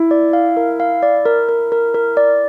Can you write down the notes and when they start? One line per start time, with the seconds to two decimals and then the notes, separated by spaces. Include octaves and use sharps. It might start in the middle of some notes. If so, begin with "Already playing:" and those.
Already playing: E4
0.11 D5
0.33 F5
0.57 A#4
0.80 F5
1.03 D5
1.26 A#4
1.49 A#4
1.72 A#4
1.94 A#4
2.17 D5